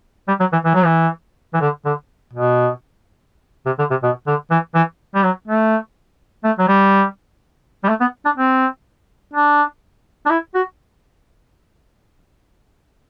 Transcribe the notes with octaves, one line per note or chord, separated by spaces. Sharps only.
G3
F#3
E3
E3
F#3
E3
E3
D3
D3
B2
C3
D3
C3
B2
D3
E3
E3
G3
F#3
A3
A3
F#3
G3
G3
A3
B3
D4
C4
D4
D4
E4
F#4